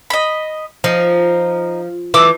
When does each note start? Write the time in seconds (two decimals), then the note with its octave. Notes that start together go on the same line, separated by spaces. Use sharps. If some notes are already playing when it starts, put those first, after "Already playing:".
0.10 D#5 B5
0.84 F3 D#4
2.14 E3 A3 D6 E6